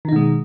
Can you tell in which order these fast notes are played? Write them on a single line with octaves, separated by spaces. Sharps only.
D#3 D#4 B2 G#3